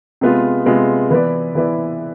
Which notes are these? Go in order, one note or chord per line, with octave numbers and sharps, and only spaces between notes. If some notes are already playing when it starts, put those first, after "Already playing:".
C3 G#3 B3 F4
C3 G#3 B3 F4
E3 B3 E4 B4 D5
E3 B3 E4 B4 D5